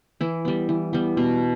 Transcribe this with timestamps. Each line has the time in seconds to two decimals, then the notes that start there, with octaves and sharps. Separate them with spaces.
0.21 E3 E4
0.45 G3 B3
0.69 E3
0.93 G3 B3
1.17 B2